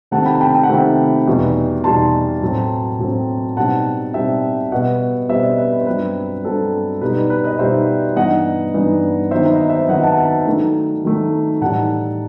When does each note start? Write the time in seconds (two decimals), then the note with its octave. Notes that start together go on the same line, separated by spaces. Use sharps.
0.11 C3 D#3 A3 F#5 A5
0.26 G5 B5
0.35 A5
0.41 G5 B5
0.55 G5
0.63 F#5
0.69 C3 D#3 A3 E5 G5
1.27 E2 B2 G3 D#4
1.84 E2 B2 G3 D#4 A5 C6
2.42 A2 F#3 C4
2.99 A2 F#3 C4
3.57 B2 G3 C4 D#4 F#5 A5
4.14 B2 G3 C4 D#4 E5 G5
4.72 B2 G3 B3 D#5 F#5
5.29 B2 G3 B3 C5 E5
5.43 B4 D#5
5.58 B4
5.72 B4
5.81 C5
5.87 G2 F#3 C4 B4
6.44 G2 F#3 C4 A4
7.01 B2 G3 D#4 B4
7.30 B4
7.44 B4 D#5
7.59 B2 G3 D#4 C5 E5
8.16 G2 E3 B3 D#4 D#5 F#5
8.74 G2 E3 B3 D#4
9.31 D#3 F#3 B3 D#4 C5 E5
9.51 B4 D#5
9.69 C5 E5
9.89 D#3 F#3 B3 D#4 D#5 F#5
10.03 F#5 A5
10.17 F#5 A5
10.47 D#3 F#3 A3 D#4
11.04 D#3 F#3 A3 D#4
11.61 A2 E3 G3 D#4 F#5 A5